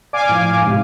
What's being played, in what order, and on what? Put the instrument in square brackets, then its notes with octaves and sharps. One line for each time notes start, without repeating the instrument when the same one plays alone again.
[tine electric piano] D5 [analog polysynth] F5 G#5 D6
[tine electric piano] A2 F3
G#2 C3